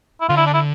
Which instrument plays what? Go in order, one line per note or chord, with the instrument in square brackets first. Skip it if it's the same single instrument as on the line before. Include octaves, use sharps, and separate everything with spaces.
[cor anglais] E4
[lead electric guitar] D3 [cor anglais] F4
[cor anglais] E4
D4
E4